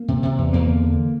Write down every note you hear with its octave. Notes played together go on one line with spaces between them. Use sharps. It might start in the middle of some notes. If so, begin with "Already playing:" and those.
Already playing: A#3
C3
C3
E2
E2 A#3
D3
D3